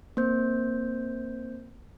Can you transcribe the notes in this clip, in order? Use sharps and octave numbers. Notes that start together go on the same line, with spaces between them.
A#3 C4 C5 G6